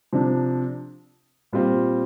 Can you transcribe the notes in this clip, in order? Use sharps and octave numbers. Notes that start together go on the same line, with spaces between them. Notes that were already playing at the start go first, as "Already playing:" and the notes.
C3 F3 D4
A#2 G3 C4 F4